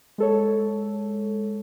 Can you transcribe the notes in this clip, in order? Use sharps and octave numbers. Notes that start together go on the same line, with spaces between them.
G#3 A4 C#5